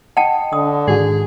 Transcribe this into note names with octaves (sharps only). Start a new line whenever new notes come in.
D#5 F#5 G5 A5
D3 D#6
G#2 D#3 F#4 G#4